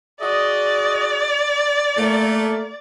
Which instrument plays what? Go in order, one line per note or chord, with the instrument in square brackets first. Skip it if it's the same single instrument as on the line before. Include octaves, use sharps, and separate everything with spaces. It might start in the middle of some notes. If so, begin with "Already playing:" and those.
[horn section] F#4 G#4 D#5 [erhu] D5
[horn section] A3 A#3